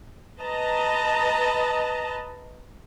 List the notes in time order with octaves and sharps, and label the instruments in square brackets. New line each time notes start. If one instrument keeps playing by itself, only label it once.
[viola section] B4 D#5 A5 A#5